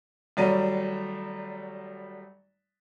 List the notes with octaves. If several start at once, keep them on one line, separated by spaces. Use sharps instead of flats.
G#1 F#3 G3 A3 D#7